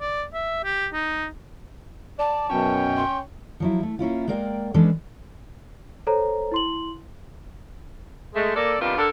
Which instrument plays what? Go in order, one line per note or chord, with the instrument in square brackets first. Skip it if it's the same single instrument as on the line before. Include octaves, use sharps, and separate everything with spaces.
[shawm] D5
E5
G4
D#4
[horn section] D5 [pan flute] A5
[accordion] F#2 B2 [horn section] C#4 C#5 G5
[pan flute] C6
[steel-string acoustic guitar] F3 F#3 E4
A3
A#3 C#4 E4 F4
G#3 A#3 A#4 D5 E5 G5
E3 G#3 C#4 D4 A4 B4
[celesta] A4 C5 C#5 A#5
E4 C6 F#7
[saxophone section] G#3 A3
A#3 A4 D5
C3 D#3 G3 B3 D4 F4
D3 A4 A#4